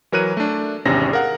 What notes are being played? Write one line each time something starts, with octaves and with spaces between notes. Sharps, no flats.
E3 F#3 A#4 C#5 F#6 D#7
A3 D4
G#1 E2 C3 C#4 D4 A#6
G#4 A#4 F5 F#5